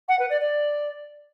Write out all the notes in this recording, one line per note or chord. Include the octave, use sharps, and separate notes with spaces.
F#5
B4
D5
D5